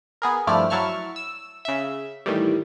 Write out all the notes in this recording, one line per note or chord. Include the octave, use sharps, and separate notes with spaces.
B3 G#4 A#4
G2 F3 A3 E4 D5 F6
F#3 E4 A5 C#6 F6
E6
C#3 E5
A2 D#3 E3 G3